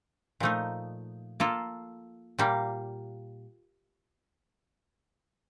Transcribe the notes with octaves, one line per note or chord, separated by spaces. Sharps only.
A#2 F3 A3 D#4
A#3 F4 A4
A#2 G3 A#3